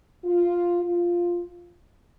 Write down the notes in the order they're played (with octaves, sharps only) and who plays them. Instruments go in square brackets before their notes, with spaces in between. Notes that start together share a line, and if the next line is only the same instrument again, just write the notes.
[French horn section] F4
F4